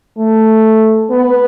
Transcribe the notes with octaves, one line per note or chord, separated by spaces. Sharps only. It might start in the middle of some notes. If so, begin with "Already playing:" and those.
A3
B3